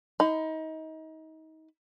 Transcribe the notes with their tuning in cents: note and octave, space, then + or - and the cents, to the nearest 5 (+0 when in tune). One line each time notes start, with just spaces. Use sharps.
D#4 +30 B5 +40